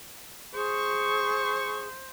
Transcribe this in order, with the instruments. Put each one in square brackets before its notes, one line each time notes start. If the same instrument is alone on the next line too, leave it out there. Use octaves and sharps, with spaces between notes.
[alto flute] G#4 [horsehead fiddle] C5 [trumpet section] C#6